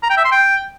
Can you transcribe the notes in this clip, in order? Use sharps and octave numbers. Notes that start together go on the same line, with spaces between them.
A#5
G5
E5
C6
G5